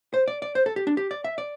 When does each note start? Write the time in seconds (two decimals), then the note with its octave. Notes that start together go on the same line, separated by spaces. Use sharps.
0.14 C5
0.28 D5
0.42 D5
0.55 C5
0.66 A4
0.76 G4
0.87 D4
0.97 G4
1.11 D5
1.24 E5
1.38 D5